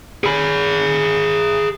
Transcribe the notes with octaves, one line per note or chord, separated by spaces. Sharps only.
G#4 B5